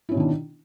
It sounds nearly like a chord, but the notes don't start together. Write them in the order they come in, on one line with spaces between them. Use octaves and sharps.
E4 C#4 B2 D#3 D4